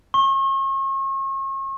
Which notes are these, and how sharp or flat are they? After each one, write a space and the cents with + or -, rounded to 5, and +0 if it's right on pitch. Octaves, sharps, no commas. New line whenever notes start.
C#6 -40